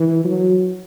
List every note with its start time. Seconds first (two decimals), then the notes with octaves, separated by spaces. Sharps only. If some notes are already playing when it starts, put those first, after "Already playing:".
Already playing: E3
0.24 F#3